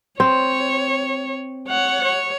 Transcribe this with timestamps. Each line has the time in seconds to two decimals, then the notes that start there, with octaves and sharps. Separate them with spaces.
0.20 C4 C#5
1.69 C#5 F#5
2.05 C#5